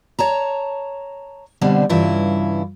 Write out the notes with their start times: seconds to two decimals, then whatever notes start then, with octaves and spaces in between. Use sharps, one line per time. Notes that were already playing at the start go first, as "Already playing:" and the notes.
0.19 C#5 A5 A#5
1.61 B2 D3 G3 C4 D4
1.89 G2 C#3 E3 E4 F4